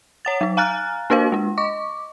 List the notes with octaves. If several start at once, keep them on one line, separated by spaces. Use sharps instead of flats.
C#5 F#5 A6
F#3 D#4
F5 G#5 A#5 F6 F#6 A6
A#3 D4 F#4 A#4 C5 F5
G#3 D4
D#5 C#6 D6